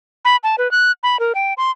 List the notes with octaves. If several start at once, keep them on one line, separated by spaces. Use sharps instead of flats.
B5
A5
B4
F#6
B5
A#4
G5
C6